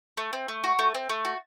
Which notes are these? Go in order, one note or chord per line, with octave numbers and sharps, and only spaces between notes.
A3
C4
A3
F#4
A3
C4
A3
F#4